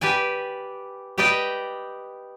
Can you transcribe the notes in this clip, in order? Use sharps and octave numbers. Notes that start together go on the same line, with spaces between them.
G4 B4 D5 G#5
G4 B4 D5 D#5 G5